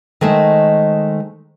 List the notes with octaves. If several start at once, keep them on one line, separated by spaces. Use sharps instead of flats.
D#3 G#3 A3 C5